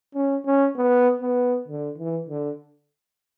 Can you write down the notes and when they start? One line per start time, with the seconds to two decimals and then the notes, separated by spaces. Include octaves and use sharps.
0.15 C#4
0.46 C#4
0.76 B3
1.22 B3
1.68 D3
1.98 E3
2.29 D3